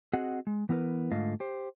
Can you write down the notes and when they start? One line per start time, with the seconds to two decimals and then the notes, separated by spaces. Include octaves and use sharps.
0.13 C4 F#4 G#4 D#5 F#5
0.47 G#3
0.69 E3 B3 E4 A#4 B4
1.12 G#2 D3 A3 F4 D#5 F5
1.40 G4 C5